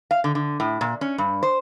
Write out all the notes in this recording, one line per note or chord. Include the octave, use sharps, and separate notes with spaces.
F5
D3
D3
A2
A#2
C#4
G2
C5